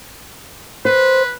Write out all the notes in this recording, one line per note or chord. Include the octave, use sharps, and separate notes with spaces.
B4 C5